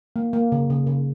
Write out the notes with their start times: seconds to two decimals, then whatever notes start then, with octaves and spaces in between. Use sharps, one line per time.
0.16 A#3
0.33 A#3
0.52 C#3
0.70 C#3
0.87 C#3